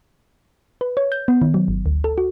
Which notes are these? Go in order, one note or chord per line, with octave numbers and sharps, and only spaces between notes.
B4
C#5
G6
B3
D#3
F#3
G1
D2
A4
F#4